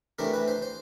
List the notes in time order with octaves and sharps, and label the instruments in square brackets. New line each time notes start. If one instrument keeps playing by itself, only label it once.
[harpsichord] C3 E3 A3 D4 A#4
B4
C5
C5